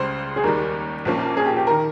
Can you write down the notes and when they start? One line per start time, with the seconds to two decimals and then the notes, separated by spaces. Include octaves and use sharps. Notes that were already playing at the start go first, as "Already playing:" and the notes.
Already playing: C#2 C#3 G3 C5
0.36 G#4
0.44 D#2 D#3 G3 A#4
1.05 A#1 A#2 F3 A#3 C#4
1.37 G#4
1.46 G4
1.56 G4
1.67 D#3 A#4